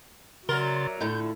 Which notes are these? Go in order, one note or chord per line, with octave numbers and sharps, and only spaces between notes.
C#3 F#3 F#4 A#4 D5 E5 C6 A6
A2 D3 A3 E4 F4 G6